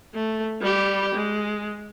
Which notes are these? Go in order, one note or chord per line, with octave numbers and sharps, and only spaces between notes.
A3
G3 G4
G#3